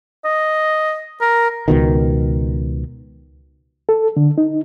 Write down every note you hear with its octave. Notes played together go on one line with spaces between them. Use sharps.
D#5
A#4
C#2 B2 D#3
A4
D3
D#4